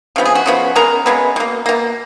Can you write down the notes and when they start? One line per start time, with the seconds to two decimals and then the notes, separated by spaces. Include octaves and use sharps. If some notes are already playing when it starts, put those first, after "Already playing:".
0.16 C#3 F3 B3
0.25 G#4
0.35 F#4
0.46 C#3 F3 B3
0.76 C#3 G#3 B3 A#4
1.06 C#3 G#3 B3
1.36 B2 A#3
1.66 B2 A#3